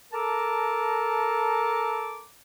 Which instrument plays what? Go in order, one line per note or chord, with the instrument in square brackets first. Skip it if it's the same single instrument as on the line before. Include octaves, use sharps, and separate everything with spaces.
[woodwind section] A4 A#4 A5 A#5 D6